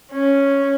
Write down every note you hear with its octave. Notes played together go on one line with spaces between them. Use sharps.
C#4